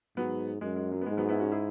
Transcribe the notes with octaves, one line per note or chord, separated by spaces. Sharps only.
G#2 F#3 B3
F#2 G#3
G#3
F#3
B3
G#2 G#3
F#3 B3
B3 E4
C#4 F#4
E4 G#4